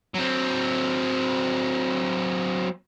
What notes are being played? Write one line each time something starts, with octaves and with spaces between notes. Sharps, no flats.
F#3 C4